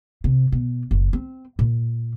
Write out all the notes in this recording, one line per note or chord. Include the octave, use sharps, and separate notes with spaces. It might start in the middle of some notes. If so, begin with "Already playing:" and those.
C3
B2
F#1
C4
A#2